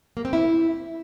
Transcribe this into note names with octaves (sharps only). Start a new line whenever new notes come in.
A#3
C4
E4